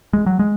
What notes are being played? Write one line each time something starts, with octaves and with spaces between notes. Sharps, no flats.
G#3
F#3
G#3